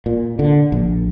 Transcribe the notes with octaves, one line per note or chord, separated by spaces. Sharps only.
A#2
D3
A#1